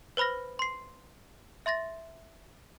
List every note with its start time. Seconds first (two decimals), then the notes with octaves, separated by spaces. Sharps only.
0.17 B4 C5 B5 F6 A#6
0.59 C6 C7
1.66 E5 C6 A6 A#6